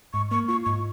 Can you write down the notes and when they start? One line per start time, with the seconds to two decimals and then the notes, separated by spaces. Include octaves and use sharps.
0.13 G#2 C#6
0.31 A#3 C#6
0.48 F4 C#6
0.65 G#2 C#6